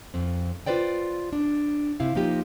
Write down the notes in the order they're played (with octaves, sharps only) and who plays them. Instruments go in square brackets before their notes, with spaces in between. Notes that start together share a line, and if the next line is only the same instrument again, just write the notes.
[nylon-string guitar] F2 C4
F4 G#4 B4 C5 D5 G5
D4
C3 E4 F5
F3 A#3 D#4 F4 G4